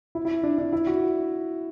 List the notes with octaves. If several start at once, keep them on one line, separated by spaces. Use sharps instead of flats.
E4
E4
D4
D4
E4
F#4